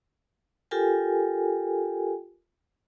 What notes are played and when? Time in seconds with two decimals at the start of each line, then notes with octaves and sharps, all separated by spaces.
0.71 F4 G4 A4 A#4 G5 G#5